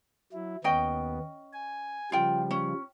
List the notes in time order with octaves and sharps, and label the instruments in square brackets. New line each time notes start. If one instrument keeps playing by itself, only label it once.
[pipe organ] F#3 E4
[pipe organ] D#2 B3 [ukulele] C#4 D#5 G5
[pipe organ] G#5
[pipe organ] C#3 F3 G3 [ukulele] F4 G5
[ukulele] C#4